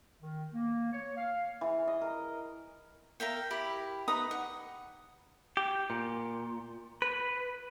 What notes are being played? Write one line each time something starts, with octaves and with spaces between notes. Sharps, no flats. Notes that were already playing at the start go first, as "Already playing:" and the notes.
D#3
A#3
C#5
F5
E3
D#5
A#4
A#4 E5 F5 G5
E4 G4 B5
D#4 B4 A#5 D#6
F#5
G4
A#2
B4